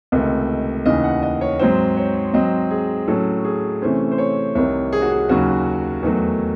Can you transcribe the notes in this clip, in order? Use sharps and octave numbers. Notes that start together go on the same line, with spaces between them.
C#2 C3 D#3 A3
D#2 C#3 E3 D#5
F#5
D#5
C#5
G#2 F#3 C4 C5
C#5
G#2 F#3 C4 D#5
G#4
A2 F#3 C#4 A4
G#4
C3 E3 A3 C#4 C5
C5
C#5
C2 C3 D#3 C#5
G#4
F#4
G#4
D#2 C#3 F#3 C#4 F#4
E2 D#3 F#3 A3